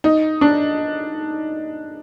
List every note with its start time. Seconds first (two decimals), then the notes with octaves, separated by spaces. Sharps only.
0.04 D#4
0.41 D4